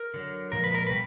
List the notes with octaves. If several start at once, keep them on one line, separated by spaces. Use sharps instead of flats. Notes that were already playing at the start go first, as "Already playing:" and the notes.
Already playing: A#4
D3 F#3
A#2 F3 G#3 A#4
B4
A#4
B2 G3 B4